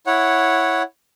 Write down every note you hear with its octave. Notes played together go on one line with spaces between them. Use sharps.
E4 C#5 F#5